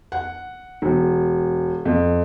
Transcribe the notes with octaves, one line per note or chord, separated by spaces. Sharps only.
F#5
E1
F2